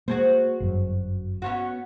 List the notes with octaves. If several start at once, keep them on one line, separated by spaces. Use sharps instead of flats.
G#3 A#3 F#4 G#4 C5
G1 F#2
B3 C#4 F#4